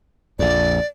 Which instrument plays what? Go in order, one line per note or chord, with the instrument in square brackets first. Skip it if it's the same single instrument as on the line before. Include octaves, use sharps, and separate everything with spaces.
[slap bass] A#1 F2 [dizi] D5